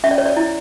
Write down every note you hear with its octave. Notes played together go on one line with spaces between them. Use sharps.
C#4 E5
D5
C#5
D5
E4